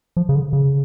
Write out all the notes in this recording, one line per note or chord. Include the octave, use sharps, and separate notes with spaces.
F3
C#3
D3
C#3